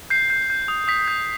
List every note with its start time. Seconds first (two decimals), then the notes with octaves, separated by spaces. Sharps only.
0.10 G6 C7
0.30 G6
0.50 G6
0.68 D#6
0.88 D#6 B6
1.08 G6